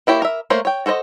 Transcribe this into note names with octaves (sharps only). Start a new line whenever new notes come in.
A#3 E4 G4 C#5
A#4 E5
A3 A#3 A#4 C5 C#5
C#5 G5
F#4 A4 C5 C#5 D#5